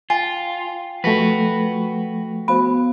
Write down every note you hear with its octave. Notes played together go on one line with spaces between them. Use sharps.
F4 G5 G#5
F3 A3 F#4 B4
B3 F#4 C5 F5 B5